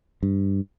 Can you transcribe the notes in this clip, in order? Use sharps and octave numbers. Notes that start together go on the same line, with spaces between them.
G2